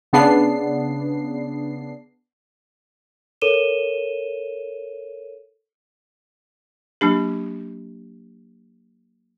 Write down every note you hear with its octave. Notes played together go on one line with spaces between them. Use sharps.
C#3 B3 D4 C7
A4 A#4 C#5 D#7 E7 G7
F#3 A#3 D4 G4